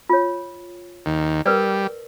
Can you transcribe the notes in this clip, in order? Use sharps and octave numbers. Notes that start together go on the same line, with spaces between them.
F4 C#5
D#2
G3 A#4 B4 D5